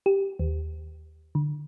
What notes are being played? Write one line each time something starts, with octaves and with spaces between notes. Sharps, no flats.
G4
D#2
D3